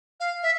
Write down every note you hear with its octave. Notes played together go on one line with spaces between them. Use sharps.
F5
E5